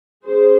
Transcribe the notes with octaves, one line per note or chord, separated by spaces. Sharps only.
F#3 C#4 G#4 C5